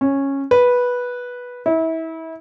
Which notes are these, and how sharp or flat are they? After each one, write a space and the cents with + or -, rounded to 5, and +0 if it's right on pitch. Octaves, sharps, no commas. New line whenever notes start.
C#4 -10
B4 -10
E4 -30